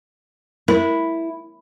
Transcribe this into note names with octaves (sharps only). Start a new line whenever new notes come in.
E4 A#4